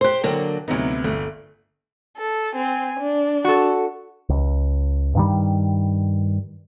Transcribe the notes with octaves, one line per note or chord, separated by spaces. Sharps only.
G4 C5 C6 F#6
D3 F#3 A#3 D4 G5
D2 C3 F#3 B3 D#4
G1 A3
A4
C4 G#5
D4
F#4 A4
C#2
G2 D#3 G3